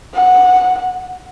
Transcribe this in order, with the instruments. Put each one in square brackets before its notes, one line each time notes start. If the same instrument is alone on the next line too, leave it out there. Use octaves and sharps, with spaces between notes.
[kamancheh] F#5